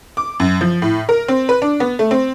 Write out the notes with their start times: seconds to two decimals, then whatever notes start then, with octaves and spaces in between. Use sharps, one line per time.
0.17 D6
0.40 F#2
0.61 F3
0.82 A2
1.09 A#4
1.28 C4
1.49 B4
1.62 D4
1.80 B3
1.99 A3
2.11 C4